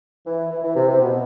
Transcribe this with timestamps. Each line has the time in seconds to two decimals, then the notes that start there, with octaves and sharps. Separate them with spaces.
0.26 E3
0.51 E3
0.63 E3
0.76 C3
0.88 C3
1.01 B2